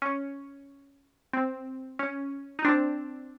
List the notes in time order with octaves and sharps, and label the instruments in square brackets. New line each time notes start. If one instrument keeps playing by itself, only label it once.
[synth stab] C#4
C4
C#4
D#4
C4 D4